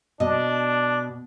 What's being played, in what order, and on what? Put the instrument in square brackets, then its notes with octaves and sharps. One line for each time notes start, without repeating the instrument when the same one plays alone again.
[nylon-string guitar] B2 [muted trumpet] D4 [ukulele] D#5